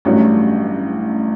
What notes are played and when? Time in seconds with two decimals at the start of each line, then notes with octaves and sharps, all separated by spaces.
0.05 A1 G2 F#3 A3 C#4